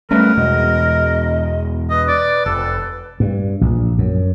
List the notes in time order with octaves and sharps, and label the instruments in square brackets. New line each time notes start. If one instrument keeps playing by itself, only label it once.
[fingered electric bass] G3 A3 C#4 [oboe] A#4 [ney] B4
[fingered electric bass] E2 B2 G#3 [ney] D#5
[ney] B4 [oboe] D#5
[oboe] D5
[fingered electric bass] F1 [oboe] A4
[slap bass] G2
A#1
F#2